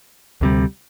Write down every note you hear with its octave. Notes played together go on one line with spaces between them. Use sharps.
D2 C3 G3